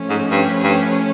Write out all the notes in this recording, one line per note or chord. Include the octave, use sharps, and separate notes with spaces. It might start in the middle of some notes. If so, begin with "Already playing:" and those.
Already playing: F3 A3 C#4
G#2
G2
G2